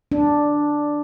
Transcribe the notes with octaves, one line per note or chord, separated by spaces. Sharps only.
D4